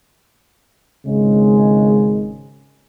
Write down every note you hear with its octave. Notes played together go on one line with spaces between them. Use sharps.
G#1 C#3 G#3